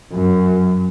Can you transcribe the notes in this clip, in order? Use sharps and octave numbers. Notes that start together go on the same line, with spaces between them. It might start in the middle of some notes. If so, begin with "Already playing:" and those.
F#2